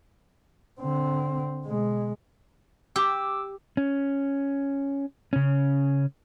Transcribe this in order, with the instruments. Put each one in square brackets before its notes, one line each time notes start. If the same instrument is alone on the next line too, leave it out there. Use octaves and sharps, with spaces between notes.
[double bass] D3 C4
B2 G#3
[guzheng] G4 [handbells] D6 E6
[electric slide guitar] C#4
C#3 C#4